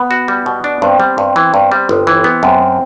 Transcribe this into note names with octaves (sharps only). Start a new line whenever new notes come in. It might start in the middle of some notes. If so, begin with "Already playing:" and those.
Already playing: B3
F#4
G3
B2
D4
G2 C4
G3
G2
E3
G2
G3
G1
E3
B3
F#2 C4